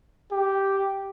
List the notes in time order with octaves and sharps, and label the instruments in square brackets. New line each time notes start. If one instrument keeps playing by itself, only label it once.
[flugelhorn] G4